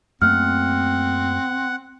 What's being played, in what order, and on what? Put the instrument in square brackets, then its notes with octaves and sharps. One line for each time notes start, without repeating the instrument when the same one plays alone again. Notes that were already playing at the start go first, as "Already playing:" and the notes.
[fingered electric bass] F#2 A3 A#3 [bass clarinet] C4 [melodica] F#5 [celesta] F6